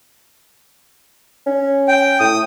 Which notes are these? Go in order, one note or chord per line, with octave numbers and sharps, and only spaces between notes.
C#4
G5
A2 D#6